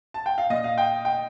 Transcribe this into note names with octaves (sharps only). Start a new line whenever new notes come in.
A5
G5
F5
A#2 D#5
F5
G5
G5